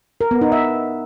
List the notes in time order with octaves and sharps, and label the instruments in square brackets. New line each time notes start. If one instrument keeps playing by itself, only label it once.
[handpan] A#4
B3
D#4
E5